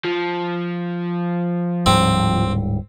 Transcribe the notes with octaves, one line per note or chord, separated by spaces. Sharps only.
F3
D1 G#2 G3 C4